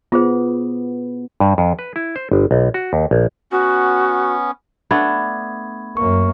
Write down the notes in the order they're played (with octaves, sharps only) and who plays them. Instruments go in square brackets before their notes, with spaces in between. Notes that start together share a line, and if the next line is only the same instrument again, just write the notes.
[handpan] B3 [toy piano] F4 G#4 C5
[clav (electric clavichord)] G2
F2
B4
E4
C5
G1
B1
F#4
D#2
A#1
[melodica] B3 C#4 [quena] F#4
[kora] A3 B3 D4 [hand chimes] B5 G#6
[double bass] F#2 A#3 [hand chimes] C#6